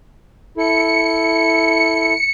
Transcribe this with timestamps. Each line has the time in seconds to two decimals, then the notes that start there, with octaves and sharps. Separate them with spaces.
0.57 E4 A4 C#7